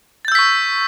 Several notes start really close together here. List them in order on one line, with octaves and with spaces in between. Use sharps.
A6 G6 E6 B6 C#6